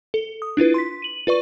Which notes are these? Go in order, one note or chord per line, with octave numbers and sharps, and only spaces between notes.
A4
D#6
D4 E4 F4 B4
C6 B6
D#7 F#7
F4 B4 D5 C#6